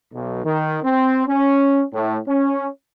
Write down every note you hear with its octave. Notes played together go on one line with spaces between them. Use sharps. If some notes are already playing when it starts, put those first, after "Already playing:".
B1
D#3
C4
C#4
A2
C#4